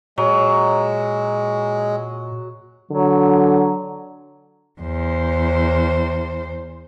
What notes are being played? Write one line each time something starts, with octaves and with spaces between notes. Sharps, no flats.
A#2 F#3 G#3
D3 F#3
E2 C5